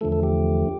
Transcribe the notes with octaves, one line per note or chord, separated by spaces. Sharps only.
E2 D3 F3 A3 A4
A4
G4